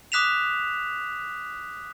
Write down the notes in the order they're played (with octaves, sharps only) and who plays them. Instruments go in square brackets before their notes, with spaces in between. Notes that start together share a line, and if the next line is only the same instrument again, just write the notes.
[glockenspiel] D6 D#6 F#6 B6 E7 F7